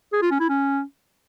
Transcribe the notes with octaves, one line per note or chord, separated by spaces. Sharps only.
G#4
F4
C#4
E4
C#4